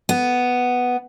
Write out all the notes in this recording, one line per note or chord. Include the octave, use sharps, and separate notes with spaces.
B3